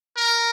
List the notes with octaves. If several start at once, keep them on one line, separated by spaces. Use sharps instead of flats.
A#4